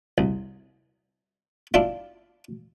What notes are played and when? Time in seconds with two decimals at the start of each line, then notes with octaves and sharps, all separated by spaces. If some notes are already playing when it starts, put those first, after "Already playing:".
0.18 C2
1.74 D4 E4 F4